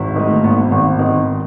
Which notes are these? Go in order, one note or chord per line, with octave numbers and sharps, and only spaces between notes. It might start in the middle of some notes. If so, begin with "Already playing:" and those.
Already playing: G#1 E4 F#4 G#4
D#3 G#3
A3
A#3
G#1 B3
G#1
D#3 C4